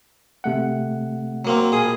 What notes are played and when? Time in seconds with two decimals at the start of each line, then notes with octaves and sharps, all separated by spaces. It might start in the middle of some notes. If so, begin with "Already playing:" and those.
0.44 C3 A3 F#5
1.45 F#3 A#3 C4
1.72 A#1 G#4